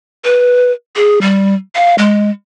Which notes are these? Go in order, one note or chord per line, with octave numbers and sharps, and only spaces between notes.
B4
G#4
G3
F5
G#3